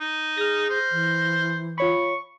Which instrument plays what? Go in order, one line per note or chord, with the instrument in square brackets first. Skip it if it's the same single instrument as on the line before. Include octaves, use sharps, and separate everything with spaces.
[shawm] D#4
[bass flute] G#4 [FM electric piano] F6 A#6
[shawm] C5
[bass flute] E3
[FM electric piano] F4 C#5 B5 [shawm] C#6